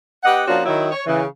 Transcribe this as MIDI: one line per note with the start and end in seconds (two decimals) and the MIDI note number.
0.23 0.42 59
0.23 0.42 67
0.23 0.42 75
0.23 0.42 78
0.47 0.62 53
0.47 0.62 58
0.47 0.62 61
0.47 0.62 62
0.47 0.62 65
0.47 0.62 66
0.65 0.91 51
0.65 0.91 54
0.65 0.91 64
0.91 1.01 73
1.07 1.24 49
1.07 1.24 52